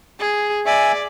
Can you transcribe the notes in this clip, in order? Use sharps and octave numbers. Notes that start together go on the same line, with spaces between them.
G#4
D5 E5 G#5